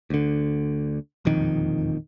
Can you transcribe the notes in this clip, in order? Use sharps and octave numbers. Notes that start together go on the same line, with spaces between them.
D2 D3
E1 A#1 F2 D#3